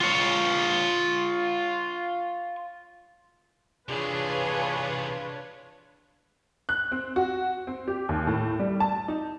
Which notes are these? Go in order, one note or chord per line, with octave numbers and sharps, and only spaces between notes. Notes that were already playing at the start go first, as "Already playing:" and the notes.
F4 C#5
C3 E3 D4 F4 G#4 B4 C#5
F#6
C4
F#4
C4
G4
D#2
A2
G3
A5
D#4